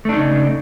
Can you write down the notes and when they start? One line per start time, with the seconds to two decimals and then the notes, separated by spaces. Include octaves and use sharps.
0.05 A3
0.09 D4
0.13 D#4
0.17 C#3